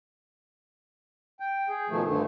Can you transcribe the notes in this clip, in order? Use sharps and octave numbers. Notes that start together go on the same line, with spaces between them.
G5
G#4
B2 D#3 F3 A3
G2 D3 A3